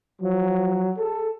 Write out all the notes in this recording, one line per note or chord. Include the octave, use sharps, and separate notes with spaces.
F3 F#3
G#4 A4